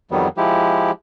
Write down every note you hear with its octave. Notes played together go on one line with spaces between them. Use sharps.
F2 D#3 F#3 G3 B3
F3 G#3 E4 G4